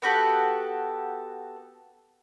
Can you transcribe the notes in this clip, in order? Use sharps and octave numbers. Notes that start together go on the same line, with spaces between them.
B3 F#4 G4 A4